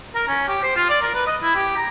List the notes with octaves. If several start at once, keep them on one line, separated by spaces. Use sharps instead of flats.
A#4
C#4
G4
C5
F4
D5
A#4
B4
D#5
E4
G4
A#5